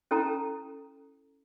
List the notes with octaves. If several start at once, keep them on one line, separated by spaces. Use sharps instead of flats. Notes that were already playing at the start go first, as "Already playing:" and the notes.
C#4 E4 A4 G5 A5 A#5